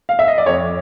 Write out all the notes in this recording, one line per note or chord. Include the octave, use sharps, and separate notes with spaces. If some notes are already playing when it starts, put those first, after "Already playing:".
F5
E5
D#5
D5
F2 C#5